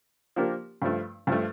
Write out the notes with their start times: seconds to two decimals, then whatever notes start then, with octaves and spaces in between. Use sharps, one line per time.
0.36 F3 A#3 D4 G4 A#4
0.82 G2 F3 A3
1.27 G2 F3 A3